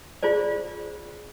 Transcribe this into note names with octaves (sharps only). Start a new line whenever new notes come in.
F4 G#4 C5 D5